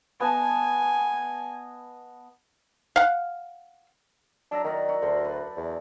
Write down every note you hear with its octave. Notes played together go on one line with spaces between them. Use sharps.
B3 D#5 G#5 A5
F5 F#5
F#3 D4 E5 A#5
D#3 F#4 A#4 D5
F#4
D2 D4 C5
B4
E2